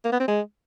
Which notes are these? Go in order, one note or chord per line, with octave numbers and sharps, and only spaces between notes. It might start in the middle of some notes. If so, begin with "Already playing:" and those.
A#3
B3
C4
G#3